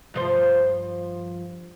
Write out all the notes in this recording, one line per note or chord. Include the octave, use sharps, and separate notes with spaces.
G2 F3 C5